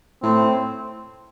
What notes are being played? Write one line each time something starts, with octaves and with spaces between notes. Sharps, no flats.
A2 C4